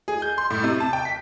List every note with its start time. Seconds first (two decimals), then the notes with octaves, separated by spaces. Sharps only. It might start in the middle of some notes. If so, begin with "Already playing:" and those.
0.08 G#4
0.22 G6
0.38 C6
0.50 A2
0.64 C3
0.80 A5
0.93 G5
1.05 B6